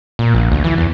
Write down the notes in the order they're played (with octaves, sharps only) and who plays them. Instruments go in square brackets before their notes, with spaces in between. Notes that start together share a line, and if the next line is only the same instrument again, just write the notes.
[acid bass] A#2
A#1
D2
E3
E2